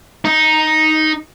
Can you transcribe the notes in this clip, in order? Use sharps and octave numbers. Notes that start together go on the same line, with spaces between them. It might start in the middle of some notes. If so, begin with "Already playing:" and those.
D#4